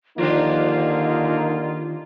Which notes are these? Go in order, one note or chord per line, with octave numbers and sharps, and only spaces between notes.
D3 D#3 F3 A#3 D4 D#4 F4 G4